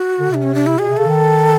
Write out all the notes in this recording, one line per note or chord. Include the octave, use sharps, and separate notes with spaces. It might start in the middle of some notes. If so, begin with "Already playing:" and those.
Already playing: F#4
D3
C3 D4
C#4
D4
E4
B2 G#4
C3
C#3 A4
D#3